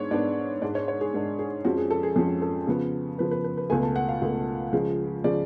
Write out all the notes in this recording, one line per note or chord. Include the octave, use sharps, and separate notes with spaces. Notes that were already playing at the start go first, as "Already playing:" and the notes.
Already playing: G#2 G#3 B3 D4 C#5
G#2 G#3 B3 D4 D5
G#2 G#3 D4 D5
C#5
C#5
G#4
G#2 G#3 D4
G#4
F2 F3 G#3 C#4 F#4
G#4
A4
G#4
F2 F3 G#3 C#4 G#4
A4
C#3 F3 B3
C#3 F3 B3 B4
B4
B4
B4
C#2 B2 A3 G#5
A5
F#5
F5
C#2 B2 A3
C#3 F3 G#3
C#3 F3 G#3 D5